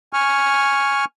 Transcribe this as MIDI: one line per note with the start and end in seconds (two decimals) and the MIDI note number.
0.13 1.05 80
0.13 1.05 85
0.13 1.05 89